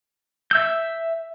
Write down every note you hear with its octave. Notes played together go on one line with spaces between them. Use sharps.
E5 E6 G6